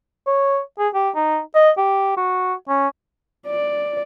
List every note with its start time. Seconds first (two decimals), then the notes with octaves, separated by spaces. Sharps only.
0.27 C#5
0.79 G#4
0.94 G4
1.15 D#4
1.55 D#5
1.78 G4
2.17 F#4
2.68 C#4
3.47 D5